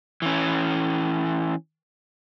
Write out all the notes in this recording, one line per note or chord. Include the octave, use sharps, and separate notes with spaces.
E3 C#4